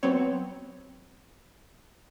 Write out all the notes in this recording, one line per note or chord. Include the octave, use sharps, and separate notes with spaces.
F#3 B3 C4 C#5